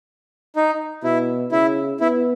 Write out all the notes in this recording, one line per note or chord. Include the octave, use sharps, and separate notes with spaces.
D#4
B2 E4
C#3 E4
B3 E4